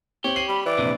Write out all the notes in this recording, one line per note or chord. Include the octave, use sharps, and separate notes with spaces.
C4 G4 C#5 F#7
C7 D#7 F#7
G3 B5
E3 D5
A#1 C3